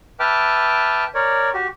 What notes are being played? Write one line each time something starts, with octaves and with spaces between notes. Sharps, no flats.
B4 E5 G5 A5 D6 F6
A#4 C#5 D5
F#4 G4